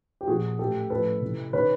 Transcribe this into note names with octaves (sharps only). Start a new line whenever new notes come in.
G4
A#2 F3 F#4 G#4
A2 E3 G4 A4
A2 F3 A4 B4
C3 E3
C3 D#3 B4 C#5